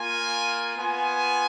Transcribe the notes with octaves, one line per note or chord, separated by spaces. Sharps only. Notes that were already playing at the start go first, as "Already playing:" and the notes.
Already playing: A#3 F4 G#5
B3 F4 G#5